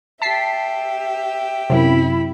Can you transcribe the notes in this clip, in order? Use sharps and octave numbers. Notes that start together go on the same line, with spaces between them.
G4 E5 A5 B6 C7
F#2 C3 E4 B5